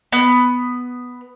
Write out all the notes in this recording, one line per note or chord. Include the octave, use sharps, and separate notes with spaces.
B3